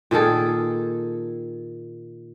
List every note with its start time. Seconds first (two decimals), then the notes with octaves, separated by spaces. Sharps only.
0.11 A#2 D#3 G#4 A4